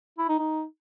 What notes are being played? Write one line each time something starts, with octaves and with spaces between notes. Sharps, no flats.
E4
D#4
D#4